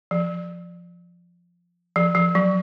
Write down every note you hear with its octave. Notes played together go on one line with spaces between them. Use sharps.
F3
F3
F3
F#3